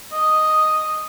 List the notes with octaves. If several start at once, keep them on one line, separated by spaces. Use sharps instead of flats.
D#5